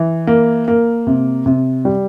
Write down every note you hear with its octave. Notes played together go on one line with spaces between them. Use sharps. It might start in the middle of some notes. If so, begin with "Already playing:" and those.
Already playing: E3
A#3
A#3
C3
C3
G3